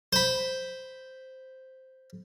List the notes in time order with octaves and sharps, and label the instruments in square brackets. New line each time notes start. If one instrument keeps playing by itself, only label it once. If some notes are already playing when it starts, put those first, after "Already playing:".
[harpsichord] C5 B5